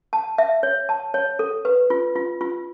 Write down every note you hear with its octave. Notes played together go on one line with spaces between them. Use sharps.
A5
E5
C#5
A5
C#5
A4
B4
F4
F4
F4